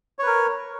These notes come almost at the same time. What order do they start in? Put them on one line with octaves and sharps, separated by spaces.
C#5 B4 A#4